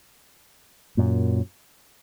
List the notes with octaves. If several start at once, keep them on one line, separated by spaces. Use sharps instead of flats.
F#2 A#2